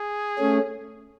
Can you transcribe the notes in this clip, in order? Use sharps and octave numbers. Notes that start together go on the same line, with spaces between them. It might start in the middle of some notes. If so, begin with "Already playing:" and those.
Already playing: G#4
A3 C#4